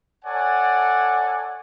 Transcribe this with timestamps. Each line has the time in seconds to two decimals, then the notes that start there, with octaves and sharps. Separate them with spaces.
0.24 A4 C#5 D5 F#5 G#5